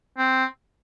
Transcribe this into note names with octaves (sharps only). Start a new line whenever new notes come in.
C4